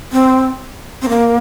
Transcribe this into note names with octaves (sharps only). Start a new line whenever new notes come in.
C4
C4
A#3